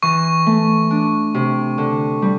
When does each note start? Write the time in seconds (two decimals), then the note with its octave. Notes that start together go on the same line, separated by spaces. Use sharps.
0.03 E3 C#6
0.46 A3
0.91 D4
1.34 C3
1.78 D3
2.22 G3